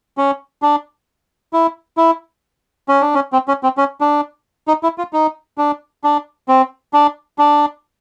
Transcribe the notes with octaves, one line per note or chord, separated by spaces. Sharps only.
C#4
D4
E4
E4
C#4
D4
C#4
C4
C#4
C4
C#4
D4
D#4
E4
F4
D#4
D4
D4
C4
D4
D4